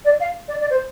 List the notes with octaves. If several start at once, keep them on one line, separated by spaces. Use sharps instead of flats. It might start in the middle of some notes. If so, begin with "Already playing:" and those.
D5
F5
D5
D5
C5